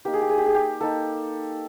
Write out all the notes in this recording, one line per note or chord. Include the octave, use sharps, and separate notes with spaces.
A#3 D#4 G4
G#4
G4
G#4
G4
G#4
G4
A#3 D#4 A4